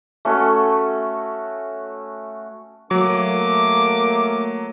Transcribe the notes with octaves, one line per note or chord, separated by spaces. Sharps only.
A3 C#4 F#4 A4
F#3 A3 A#3 D6